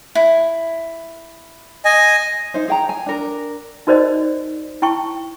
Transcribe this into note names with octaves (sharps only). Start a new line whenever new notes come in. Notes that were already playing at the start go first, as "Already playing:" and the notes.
E4
D#5 G#5
D#4 C5
G#4 G5 A#5
G#5
D4 A#4
D#4 F#4 A#4 C5 D5 D#5
E4 G5 A5 C#6